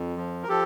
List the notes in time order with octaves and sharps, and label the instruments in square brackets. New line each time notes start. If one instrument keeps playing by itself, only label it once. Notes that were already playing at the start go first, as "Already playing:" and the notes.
Already playing: [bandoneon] F2
F3
A#4
F3 G4 A4